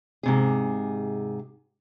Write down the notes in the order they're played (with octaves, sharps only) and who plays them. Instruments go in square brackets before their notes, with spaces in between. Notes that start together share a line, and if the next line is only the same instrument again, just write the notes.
[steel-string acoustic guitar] G#2 C3 G#4